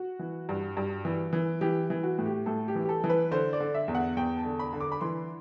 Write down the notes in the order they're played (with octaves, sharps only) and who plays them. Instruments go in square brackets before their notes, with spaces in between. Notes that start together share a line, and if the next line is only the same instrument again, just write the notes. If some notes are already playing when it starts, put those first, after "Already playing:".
Already playing: [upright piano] F#4
E3
G2
G2
E3
E3
E3 G4
E3
F#4
A2
G4
A2 A4
G4
E3
G4
A4
E3
B4
D3 C5
D5
D3
E5
E2
F#5
E2 G5
A5
D3
B5
D3
D6
B5
E3 C6